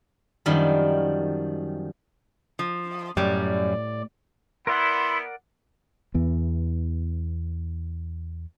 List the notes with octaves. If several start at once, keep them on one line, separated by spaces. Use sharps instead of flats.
F#2 D#3 F3 G3
F3
F#2 A2 G3 D5
B3 E4 A#4 D5 F#5 C6
E2 E3 B3